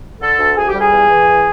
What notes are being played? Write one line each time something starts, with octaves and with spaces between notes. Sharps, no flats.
D3 A4
D2
D2 G#4
G4
G3
G#4
E2
E3
E2